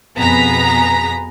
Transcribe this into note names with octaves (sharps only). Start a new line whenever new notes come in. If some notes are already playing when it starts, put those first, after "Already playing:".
F2 B2 B3 G#4 A#5 B6